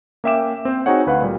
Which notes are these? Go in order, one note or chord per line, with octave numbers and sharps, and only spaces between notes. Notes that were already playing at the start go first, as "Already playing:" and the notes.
A#3 C#4 E5 G5 D6 E7
C4 C5
C4 D#4 F#4 G#4 C#5 F#5
D2 B4 F5 F#5
A#2 G3